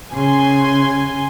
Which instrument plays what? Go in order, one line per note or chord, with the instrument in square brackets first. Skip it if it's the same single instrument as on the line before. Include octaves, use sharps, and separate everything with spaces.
[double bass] C#3 [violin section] G#5 C6